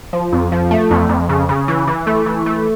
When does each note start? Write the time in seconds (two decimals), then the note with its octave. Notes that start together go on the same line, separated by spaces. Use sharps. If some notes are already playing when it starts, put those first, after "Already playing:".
0.13 F3
0.32 F2
0.52 F3
0.71 A3
0.91 F2
1.09 F2
1.29 C#3
1.49 C#3
1.68 E3
1.88 E3
2.07 A3
2.26 E3
2.46 A3